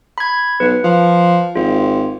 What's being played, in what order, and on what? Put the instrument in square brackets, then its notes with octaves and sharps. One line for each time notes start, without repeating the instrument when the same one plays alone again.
[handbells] B5 G#6
[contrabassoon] B1 [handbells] B4
[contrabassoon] F3
[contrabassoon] G#1 [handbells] F4